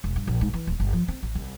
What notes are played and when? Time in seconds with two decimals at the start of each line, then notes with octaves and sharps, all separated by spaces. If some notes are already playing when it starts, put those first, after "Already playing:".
0.04 E1
0.16 G2
0.27 A#1
0.41 G#2
0.53 E3
0.67 D1
0.80 G1
0.93 F3
1.08 C4
1.23 A1
1.35 C2